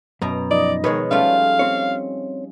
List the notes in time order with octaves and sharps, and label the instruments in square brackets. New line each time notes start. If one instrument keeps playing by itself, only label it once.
[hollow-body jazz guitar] F#2 [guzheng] B2 A#5
[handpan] F3 D#4 D#5 [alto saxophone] D5
[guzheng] B2 G#3 [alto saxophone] D#3 [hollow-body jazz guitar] B4 C#5
[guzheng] G3 A3 F4 [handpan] C#4 [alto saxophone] F5
[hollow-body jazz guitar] C4 C#5